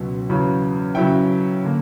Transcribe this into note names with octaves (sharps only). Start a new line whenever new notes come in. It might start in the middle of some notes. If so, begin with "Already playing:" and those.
Already playing: C#2 B2 F#3 C#4
E2 C#3 F#3
C#3 F#3 C#4 E4 G5
D3 A#3